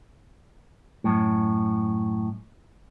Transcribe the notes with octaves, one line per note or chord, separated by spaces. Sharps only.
F#2 A2